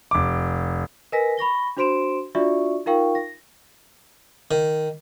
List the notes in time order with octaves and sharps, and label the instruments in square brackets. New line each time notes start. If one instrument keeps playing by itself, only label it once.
[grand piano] F1 D6
[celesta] A#4 B4 D#5 G#5 A#6 B6
B5 C#6 A#6 G7
D4 F#4 C5 C6 D7 E7
D4 F4 F#4 D5 E5 C#6
D#4 F4 A#4 F5 G5 C#6
A#6
[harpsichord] D#3